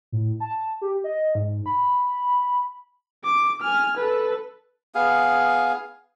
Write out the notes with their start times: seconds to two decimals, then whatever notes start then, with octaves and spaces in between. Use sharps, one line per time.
0.12 A2
0.40 A5
0.82 G4
1.04 D#5
1.35 G#2
1.66 B5
3.25 D6
3.62 G#5 F6
3.97 A4 B4
4.95 B3 G#4 F5